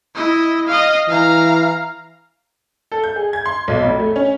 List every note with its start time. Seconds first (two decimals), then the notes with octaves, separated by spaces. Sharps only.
0.15 E4 D#5
0.67 D#5 F5
1.08 E3 F5 A#5
2.92 A4
3.04 G6
3.16 G#4
3.33 G#6
3.46 C6
3.68 B1
3.83 F1
3.99 A3
4.16 C#4